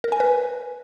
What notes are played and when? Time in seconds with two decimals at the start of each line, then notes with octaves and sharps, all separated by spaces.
0.04 A#4
0.12 G#5
0.20 B4